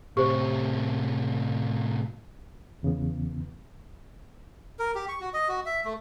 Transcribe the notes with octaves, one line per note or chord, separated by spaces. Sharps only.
A2 C3 G4 C5
E2 C#3 E3 B3
A#4
G4
C#6
F#4
D#5
F#4
E5
A3